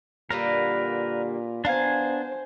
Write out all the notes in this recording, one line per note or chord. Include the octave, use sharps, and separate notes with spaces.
A#2 D3 G3 A#3 A#4 B4
B3 D4 C5 F5 G#5 A#5